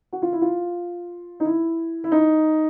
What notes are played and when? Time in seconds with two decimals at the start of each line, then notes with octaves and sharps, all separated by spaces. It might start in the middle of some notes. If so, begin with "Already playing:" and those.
0.12 F#4
0.22 F4
0.33 E4
0.41 F4
1.40 D#4
1.45 E4
2.04 E4
2.12 D#4